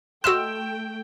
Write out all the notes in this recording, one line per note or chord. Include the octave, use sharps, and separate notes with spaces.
A3 F#4 D#5 G5 C6 E6 F6 E7